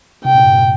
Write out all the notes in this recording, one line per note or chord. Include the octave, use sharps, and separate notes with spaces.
C3 G5
A#2
G2
A#2